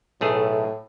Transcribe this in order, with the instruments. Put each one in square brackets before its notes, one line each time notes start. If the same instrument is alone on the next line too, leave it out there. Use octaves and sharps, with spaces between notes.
[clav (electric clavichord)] B1 A3 G#4 [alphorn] A2